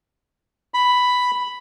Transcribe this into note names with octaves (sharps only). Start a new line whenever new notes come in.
B5